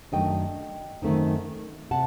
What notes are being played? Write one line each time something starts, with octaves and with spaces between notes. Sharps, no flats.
F#2 D#3 F#3 A3 D4 D#5 G5
F#2 D#3 A3 C4 D#4
C3 F#5 A5